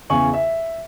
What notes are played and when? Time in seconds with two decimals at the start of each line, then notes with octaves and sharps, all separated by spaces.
0.10 E2 C#3 G#5 C#6 F#7
0.34 E5